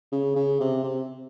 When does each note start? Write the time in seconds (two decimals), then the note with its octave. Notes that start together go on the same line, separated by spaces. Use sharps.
0.12 C#3
0.36 C#3
0.60 C3
0.83 C3